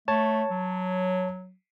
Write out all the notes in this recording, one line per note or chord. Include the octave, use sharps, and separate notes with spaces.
A3 C#5 A5
F#3